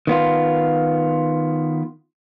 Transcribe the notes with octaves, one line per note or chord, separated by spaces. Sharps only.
D#3 B3 F4